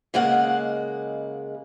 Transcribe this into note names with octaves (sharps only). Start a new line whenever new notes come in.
C#3 G#3 A#3 D#5 F#5